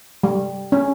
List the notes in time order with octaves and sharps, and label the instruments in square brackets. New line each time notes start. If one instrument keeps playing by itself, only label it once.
[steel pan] G3
C#4